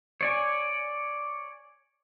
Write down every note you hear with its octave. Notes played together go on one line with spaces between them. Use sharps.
C#5 D5 G#5